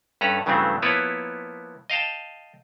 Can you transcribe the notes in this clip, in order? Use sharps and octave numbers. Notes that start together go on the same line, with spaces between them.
G2 C#4 A4 B4 A#5
G2 C#3 E3 F#3 A3 C4
F3 A#3 B3 E4 B4 C#5
D#5 F5 G5 A5